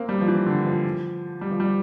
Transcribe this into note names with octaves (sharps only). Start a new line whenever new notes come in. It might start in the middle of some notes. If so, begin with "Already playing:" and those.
Already playing: A#3 C4
G3
F3
E3
D3
F3
G3
F3
G3